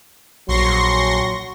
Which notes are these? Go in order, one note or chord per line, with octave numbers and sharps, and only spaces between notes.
A#1 F#3 C6 C#6 A#6